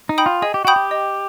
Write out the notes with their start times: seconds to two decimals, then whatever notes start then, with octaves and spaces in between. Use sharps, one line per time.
0.09 D#4
0.18 G5 B5 D#6 G6
0.26 F4
0.42 G#4 D#5
0.54 G4
0.65 F#4 G5 B5 D#6 G6
0.76 G4
0.91 D#5